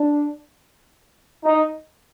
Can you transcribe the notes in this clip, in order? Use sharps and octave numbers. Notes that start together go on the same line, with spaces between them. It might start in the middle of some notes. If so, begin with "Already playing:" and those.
Already playing: D4
D#4